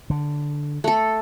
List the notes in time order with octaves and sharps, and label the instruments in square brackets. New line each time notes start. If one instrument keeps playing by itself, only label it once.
[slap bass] D3
[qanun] A3 A4